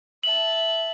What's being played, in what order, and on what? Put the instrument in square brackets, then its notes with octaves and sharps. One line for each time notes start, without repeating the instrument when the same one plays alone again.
[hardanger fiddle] E5 A5 [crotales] F#7